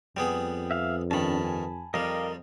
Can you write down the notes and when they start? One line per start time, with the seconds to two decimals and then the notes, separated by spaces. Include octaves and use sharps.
0.17 F2 G3 B3 G#4 G5
0.71 E5 F5
1.11 G2 D#3 C#4 D4 A5 B5
1.45 G#5
1.94 F2 G3 A#4 D#5 F5 D6